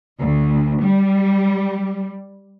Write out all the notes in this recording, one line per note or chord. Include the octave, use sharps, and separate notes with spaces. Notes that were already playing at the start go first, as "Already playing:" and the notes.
D2
G3